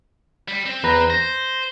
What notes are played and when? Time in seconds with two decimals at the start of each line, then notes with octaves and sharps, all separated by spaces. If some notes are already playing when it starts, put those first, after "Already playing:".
0.48 G3
0.66 C4
0.83 E2 B4 A#5
1.10 C5 A#6